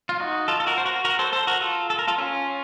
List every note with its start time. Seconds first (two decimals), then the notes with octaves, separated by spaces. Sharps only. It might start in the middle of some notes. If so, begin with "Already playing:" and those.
0.09 F4
0.20 D#4 F#4
0.48 F4 A4
0.60 A4
0.67 F#4 A#4
0.78 C5
0.86 F#4 A#4
1.05 F#4 A#4
1.19 A4 C5
1.33 A4 C5
1.47 F#4 A#4
1.61 F4 A4
1.90 A4
1.99 A#4
2.08 F4 A4
2.18 C#4 F4